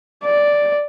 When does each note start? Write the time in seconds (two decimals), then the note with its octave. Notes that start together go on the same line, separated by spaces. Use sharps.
0.24 D5